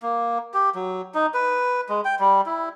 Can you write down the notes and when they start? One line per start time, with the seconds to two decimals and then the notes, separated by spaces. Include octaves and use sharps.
0.02 A#3
0.54 G4
0.75 F#3
1.15 D#4
1.34 B4
1.89 G#3
2.05 G5
2.19 G3
2.46 E4